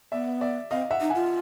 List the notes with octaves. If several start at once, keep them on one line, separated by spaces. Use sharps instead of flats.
B3 D5 E5
D5 E5
C4 D#5 F5
E5 F#5
D#4
F#5 G#5
F4